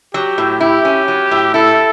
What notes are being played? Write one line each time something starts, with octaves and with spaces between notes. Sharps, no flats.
F#3 G4
A2
E4 G4
C#4
F#3
A2
E4 A4